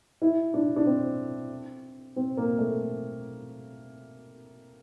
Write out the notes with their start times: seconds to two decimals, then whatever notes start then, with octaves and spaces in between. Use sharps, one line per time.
0.22 E4
0.54 D4
0.76 D4
0.86 C4
2.16 C4
2.37 A#3
2.59 A3